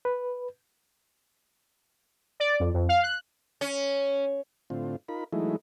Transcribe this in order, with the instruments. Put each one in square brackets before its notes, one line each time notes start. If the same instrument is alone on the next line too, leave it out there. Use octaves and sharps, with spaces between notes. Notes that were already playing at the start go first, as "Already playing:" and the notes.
[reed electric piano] B4
[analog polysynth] D5
F2
F2
F5
F#6
[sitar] C#4
[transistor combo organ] A2 D3 C4 F4
D#4 F4 A#4 B5
E3 F#3 G#3 A3 D#4 E4